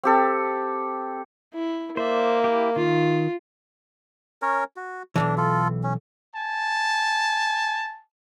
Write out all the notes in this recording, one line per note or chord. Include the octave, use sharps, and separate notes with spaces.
C4 G4 A4
E4
A#3 C5 D5 E5
E4 G4
D#3 F4
C#4 A#4 C#5
F#4
B1 G#2 E3 D4
F4 A4
C#4
G#5 A5